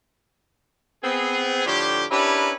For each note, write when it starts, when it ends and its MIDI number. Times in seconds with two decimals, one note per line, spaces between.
1.04 1.65 59
1.04 1.65 60
1.04 1.65 68
1.66 2.06 45
1.66 2.06 50
1.66 2.06 53
1.66 2.06 62
1.66 2.06 67
2.11 2.53 61
2.11 2.53 62
2.11 2.53 64
2.11 2.53 67
2.11 2.53 70
2.11 2.53 71